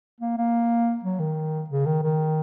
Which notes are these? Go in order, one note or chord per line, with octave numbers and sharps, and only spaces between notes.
A#3
A#3
F#3
D#3
C#3
D#3
D#3